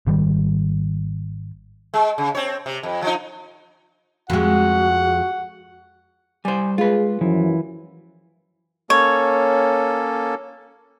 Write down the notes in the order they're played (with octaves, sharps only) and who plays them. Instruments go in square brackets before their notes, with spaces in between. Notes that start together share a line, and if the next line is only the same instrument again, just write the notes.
[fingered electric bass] G#1 D#3 G3
[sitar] G#3
C#3
C4 C#5
C3
F2
F3 D#4
[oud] F2 G#3 [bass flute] F#4 [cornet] F#5
[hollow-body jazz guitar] G3 C5 [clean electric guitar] G#5
[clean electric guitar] G#3 [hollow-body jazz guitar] F4 B4 [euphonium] G#4
[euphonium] F#2 [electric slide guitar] E3 [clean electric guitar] F3
[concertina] A#3 C#4 A4 [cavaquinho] C#5